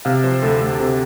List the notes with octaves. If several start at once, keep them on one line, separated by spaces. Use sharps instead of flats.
C3 F5
F3 C5
D2 A4
D2
C3